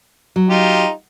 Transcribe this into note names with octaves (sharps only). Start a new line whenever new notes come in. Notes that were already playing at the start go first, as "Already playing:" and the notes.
F#3
D#4 F4 G4